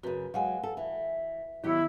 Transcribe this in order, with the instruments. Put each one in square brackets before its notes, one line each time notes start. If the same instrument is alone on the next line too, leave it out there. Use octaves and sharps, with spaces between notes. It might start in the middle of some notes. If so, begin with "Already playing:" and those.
[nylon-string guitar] F#2 C#3 [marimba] F#4 B4
[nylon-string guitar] F#3 G#3 [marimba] F5 F#5 G#5
[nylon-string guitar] A4
E3
[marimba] D#3 B3 [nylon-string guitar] F#3 G4 [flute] E4